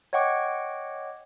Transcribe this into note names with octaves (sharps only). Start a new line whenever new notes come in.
C#5 D#5 F#5 G5 C#6 D6